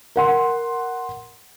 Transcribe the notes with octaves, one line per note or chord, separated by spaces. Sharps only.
A#4 F#5 C6